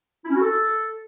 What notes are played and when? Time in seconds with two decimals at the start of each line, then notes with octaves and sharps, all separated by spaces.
0.24 E4
0.30 C#4
0.35 F#4
0.41 A4